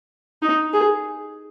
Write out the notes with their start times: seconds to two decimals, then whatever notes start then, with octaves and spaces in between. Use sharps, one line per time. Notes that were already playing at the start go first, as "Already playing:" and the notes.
0.42 D#4
0.73 G#4